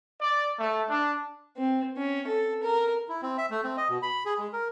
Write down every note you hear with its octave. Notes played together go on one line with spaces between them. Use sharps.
D5
A3
D4
C4
C#4
A4
A#4
E4
C4
E5
A3
C4
D#5
B2
B5
G#4
G#3
A#4